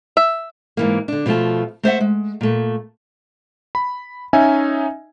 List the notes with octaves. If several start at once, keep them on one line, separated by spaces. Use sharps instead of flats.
E5
G#2 E3 A#3
D3 D4
B2 F3 A3 F4 A5
A3 C5 E5 F#5
G#3
A#2 A3
B5
C#4 D#4 D#5 E5 G#5